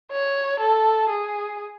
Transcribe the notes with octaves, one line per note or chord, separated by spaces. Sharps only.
C#5
A4
G#4